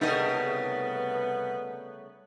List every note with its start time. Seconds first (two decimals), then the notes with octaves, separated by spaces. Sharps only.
0.01 C2 C#3 G3 A3 B3 D#4 A#4 D#5